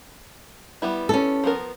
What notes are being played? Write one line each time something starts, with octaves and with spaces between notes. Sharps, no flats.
G3 B3 E4
C#4 A4
F3 B3 A#4